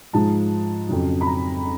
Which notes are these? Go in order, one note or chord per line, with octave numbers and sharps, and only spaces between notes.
G#2 F3 G#3 A5
F2 C#3 F#3
B5
A#5